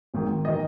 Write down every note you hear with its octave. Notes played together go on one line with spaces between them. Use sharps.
G#1 G#2 D#3
D#3 D#5